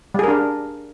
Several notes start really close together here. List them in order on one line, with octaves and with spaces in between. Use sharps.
G3 G#4 A#4 D4